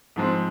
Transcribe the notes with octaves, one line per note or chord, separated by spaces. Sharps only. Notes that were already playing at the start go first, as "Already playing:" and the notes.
G#2 F3 G#3 C4